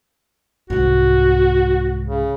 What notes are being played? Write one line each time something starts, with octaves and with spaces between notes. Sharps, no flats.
C2 G#2 F#4
C#3